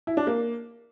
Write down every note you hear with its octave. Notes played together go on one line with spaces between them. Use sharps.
E4
D4
A#3